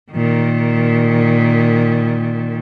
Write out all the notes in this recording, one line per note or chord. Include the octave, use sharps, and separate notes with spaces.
A#2 D#3